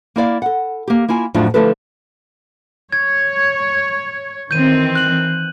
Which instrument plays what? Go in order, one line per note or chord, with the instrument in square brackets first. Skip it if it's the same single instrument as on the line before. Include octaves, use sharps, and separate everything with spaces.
[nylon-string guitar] A#3 E4 D5 F5
A4 F#5
A#3 G4
A#3 E4 F4 G#5
F2 A2 F#3 D4 E4 F4
D3 F3 A3 E4 A4 B4
[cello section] C#5 [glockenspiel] G#6
[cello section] D#3 E3 C4 [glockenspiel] G6 D#7
[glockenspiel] F#6 F#7